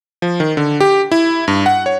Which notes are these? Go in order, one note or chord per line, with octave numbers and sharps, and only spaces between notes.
F3
D#3
D3
G4
E4
G2
F#5
C#5